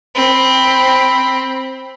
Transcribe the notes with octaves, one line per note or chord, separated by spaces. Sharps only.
C4 B5